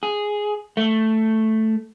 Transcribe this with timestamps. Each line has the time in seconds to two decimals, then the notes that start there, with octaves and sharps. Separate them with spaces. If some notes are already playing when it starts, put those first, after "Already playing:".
0.03 G#4
0.77 A3